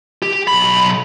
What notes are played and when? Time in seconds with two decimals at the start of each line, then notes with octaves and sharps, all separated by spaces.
0.22 G4
0.48 B1 B5